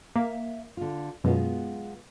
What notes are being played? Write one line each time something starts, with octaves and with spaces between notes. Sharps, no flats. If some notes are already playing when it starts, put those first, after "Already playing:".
A#3 E5 F5
D3 F4
F#2 B2 G#3 B3 F4